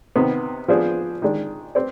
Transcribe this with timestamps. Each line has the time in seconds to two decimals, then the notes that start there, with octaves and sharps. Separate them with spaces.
0.16 C3 D#3 B3
0.68 F3 B3 D4 G#4 C5
1.22 D#3 G#3 D4
1.75 C4 B4 D5